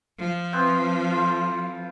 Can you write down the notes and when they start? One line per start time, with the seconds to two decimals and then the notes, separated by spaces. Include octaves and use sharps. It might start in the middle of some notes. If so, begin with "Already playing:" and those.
0.19 F3
0.52 B3 C4 E5
1.11 F4 A4